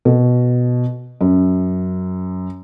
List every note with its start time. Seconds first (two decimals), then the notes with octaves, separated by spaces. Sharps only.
0.05 B2
1.21 F#2